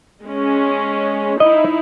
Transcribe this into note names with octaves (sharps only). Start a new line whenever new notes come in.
G#3 C#4
D#4 E4 D#5